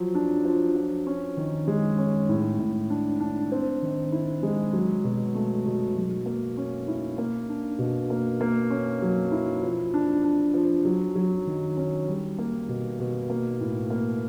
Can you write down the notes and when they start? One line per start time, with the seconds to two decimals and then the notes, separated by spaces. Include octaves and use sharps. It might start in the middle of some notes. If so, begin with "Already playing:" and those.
Already playing: F3 F#3
0.15 D4
0.45 F3
0.76 F3
1.07 C#4
1.37 D#3
1.68 G#3
1.98 C#4
2.29 A2
2.59 A2
2.90 D4
3.20 D4
3.52 C4
3.82 D#3
4.12 E4
4.43 G#3
4.73 F#3
5.04 B2
5.35 A3
5.66 B2
5.96 F#3
6.26 A#3
6.57 C#4
6.88 E4
7.18 A#3
7.49 D4
7.79 B2
8.10 A#3
8.41 A#3
8.70 C#4
9.02 F#3
9.32 E4
9.62 F3
9.94 D4
10.24 D4
10.54 F3
10.85 F#3
11.15 F#3
11.47 D#3
11.77 C#4
12.08 G3
12.39 A#3
12.69 B2
13.00 B2
13.30 A#3
13.61 A2
13.90 A#3